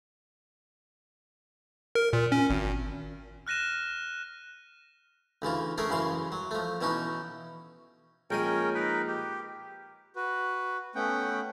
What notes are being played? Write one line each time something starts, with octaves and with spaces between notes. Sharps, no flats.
A#4
A#2
C#4
G#1
F6 F#6 A#6 D#7 E7
D2 C#3 E3 F4
A3 C#4 G#4 A#4
F#2 C#3 E3 F5 C6
F#3
F3 A3
B2 E3 C#4 D#4 F#4
A#1 G#3 C#4 A#4 G5 G#5
D#4 A#4 B4
G4
F#4 B4
A3 B3 C#4 F#5 G5